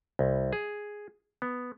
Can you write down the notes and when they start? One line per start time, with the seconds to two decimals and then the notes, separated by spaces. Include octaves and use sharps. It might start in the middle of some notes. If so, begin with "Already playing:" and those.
0.19 C2
0.53 G#4
1.42 B3